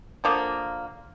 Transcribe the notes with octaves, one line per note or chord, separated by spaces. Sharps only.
D3 F3 A#3